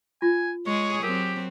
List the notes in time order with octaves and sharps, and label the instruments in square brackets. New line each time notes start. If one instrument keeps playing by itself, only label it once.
[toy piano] F4 [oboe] G#5
[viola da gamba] G#3 G#4 [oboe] C#5
[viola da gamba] F#3 C4 [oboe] G4 [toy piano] A#4